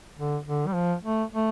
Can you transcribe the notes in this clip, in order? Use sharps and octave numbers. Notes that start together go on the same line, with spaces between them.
D3
D3
G3
F3
A3
A3